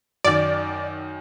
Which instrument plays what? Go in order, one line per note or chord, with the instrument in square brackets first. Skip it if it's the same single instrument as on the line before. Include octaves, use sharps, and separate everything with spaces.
[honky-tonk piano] F#2 D#3 [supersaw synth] D5